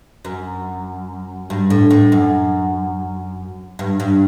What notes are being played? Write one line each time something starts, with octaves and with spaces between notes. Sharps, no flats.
F#2
G2
A2
A2
F#2
G2
G2